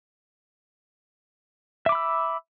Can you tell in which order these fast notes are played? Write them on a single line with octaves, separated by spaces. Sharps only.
E5 D6 B5 E6